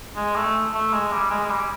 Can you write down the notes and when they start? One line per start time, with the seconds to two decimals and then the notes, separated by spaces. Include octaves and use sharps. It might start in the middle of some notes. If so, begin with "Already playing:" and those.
0.16 G#3
0.35 A3
0.73 A3
0.93 G#3
1.12 G3
1.30 G#3
1.46 G#3
1.50 G3